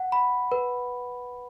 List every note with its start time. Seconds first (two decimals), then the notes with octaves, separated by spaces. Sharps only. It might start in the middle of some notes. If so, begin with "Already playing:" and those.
Already playing: F#5
0.12 B5
0.52 B4